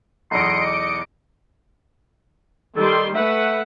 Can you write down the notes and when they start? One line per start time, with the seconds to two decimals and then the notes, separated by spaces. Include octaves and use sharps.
0.31 B1 E2 D#5 C6 C#7 D7
0.66 D6
2.76 D#3 G3 A4 C6
3.15 A3 B4 E5 F#5